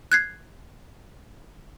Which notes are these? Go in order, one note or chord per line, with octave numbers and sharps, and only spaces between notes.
F#6 G#6 C7